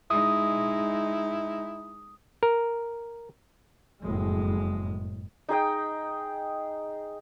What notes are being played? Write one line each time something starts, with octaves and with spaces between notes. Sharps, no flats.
G#3 D#4 E4 D#6
A#4
F#1 F2 A2 G#3
D#4 G#4 D#5 G5